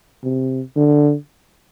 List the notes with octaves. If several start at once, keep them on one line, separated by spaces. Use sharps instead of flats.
C3
D3